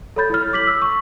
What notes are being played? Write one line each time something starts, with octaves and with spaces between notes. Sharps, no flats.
A4 C#5 B5 G6 A6
E4 A4 C#5 F6
D6 B6 F#7
E6
C#6